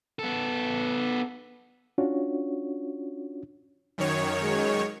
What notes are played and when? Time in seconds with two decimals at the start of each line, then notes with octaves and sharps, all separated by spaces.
0.19 B3 A4
1.98 C#4 D4 F4 F#4 C#5
3.98 F#2 D#3 C#5
4.42 G#3